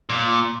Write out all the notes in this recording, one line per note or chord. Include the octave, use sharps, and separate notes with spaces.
A#2